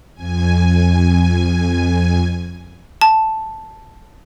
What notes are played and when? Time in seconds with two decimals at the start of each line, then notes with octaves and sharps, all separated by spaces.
0.15 F2 G#5
3.01 A5